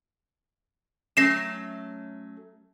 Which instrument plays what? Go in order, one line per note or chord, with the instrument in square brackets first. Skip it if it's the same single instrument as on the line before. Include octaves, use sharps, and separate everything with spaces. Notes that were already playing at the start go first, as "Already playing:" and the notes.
[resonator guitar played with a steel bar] F#3 A3 C#4 [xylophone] A#6 C7 E7